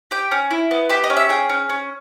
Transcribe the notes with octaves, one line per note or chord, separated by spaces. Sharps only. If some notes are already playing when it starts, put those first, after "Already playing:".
G4 G5
C#4
E4
B3
G4 E5
D#5
C#4
E5
G#4 G5
C#4
C#4